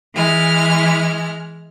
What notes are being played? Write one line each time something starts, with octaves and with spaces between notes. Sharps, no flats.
E3 G#3 F6